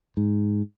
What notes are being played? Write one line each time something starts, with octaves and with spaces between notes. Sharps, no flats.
G#2